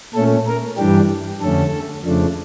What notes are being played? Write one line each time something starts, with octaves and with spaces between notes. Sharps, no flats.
A#2 A3 C#4 A4
A#4
G2 E3 G3 D4 G4
F2 D3 A3 C#4 A4
F2 C#3 F3 A3 D4